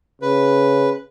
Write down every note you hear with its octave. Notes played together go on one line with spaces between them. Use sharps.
C#3 B4